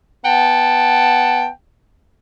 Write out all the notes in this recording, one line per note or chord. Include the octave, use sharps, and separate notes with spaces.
B3 F#5 G5 A5